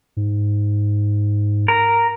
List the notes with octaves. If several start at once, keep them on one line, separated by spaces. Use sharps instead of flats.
G#2
A#4